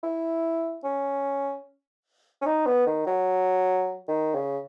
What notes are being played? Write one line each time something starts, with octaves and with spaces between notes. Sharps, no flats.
E4
C#4
C#4
D#4
B3
D#3
F#3
D#3
C#3